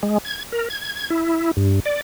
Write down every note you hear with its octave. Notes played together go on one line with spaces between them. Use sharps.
G#3
G#6
A#4
G#6
E4
G2
D5